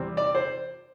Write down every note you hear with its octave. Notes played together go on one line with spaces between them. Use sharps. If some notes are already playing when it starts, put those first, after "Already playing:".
Already playing: E2 C3 G3 C4
D5
C5